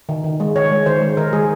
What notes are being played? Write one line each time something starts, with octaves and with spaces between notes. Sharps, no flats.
D#3
D#3
G#3
D#3 C#5
G#3
D#3 C5
G#3
D#3 A#4
G#3 G#4